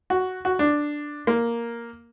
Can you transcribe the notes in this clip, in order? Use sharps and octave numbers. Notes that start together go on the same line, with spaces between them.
F#4
F#4
D4
A#3